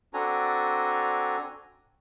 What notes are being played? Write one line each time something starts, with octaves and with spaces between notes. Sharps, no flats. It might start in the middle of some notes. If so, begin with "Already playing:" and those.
C4 D4 F#4 A4 G#5 A#5